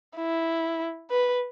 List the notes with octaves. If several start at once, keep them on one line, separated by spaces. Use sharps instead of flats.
E4
B4